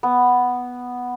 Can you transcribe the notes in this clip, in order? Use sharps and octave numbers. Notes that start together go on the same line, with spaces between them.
B3